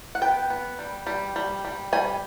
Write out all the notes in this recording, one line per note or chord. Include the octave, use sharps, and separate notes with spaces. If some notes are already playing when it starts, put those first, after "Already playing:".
F#5
B3 G5
B3
G3
G3
G3
G3
G3 G#5